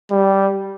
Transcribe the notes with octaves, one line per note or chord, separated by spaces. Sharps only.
G3